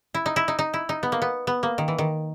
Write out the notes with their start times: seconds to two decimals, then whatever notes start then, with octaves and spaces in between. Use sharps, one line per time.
0.14 E4
0.26 D#4
0.36 E4
0.48 D#4
0.59 D#4
0.74 E4
0.89 D#4
1.03 B3
1.12 A#3
1.22 B3
1.47 B3
1.63 A#3
1.78 D#3
1.88 E3
1.98 D#3